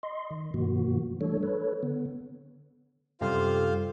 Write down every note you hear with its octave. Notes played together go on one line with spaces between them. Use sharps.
D#5 C6
D#3
G2 B2 D#3 F3 A#3 F#4
E3 G3 A3 D4 A4 C#5
A4 B4 C#5
D3 B3
F#2 C3 G3 F4 G4 A4 C5 F5